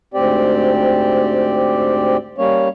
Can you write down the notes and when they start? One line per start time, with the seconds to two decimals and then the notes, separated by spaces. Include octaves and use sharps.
0.14 D2 G#2 C4 G4 D5
2.38 G3 A#3 C#4 C#5